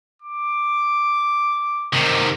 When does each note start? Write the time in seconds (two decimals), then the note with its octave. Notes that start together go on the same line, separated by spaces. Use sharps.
0.22 D6
1.93 C3 D#3